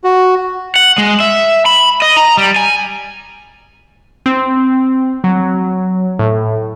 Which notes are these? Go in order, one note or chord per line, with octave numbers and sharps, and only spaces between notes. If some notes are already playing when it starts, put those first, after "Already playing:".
F#4
F#5
G#3
E5
B5
D#5
A#5
G3
G#5
C4
F#3
A2